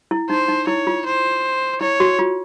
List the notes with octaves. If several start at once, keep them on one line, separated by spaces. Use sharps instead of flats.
E4
D#4 C5
D#4
E4 C#5
F4
C5
E4 C#5
F#4
F4